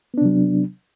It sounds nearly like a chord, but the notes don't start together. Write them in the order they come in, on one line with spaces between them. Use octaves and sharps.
B3 D4 C3 F#3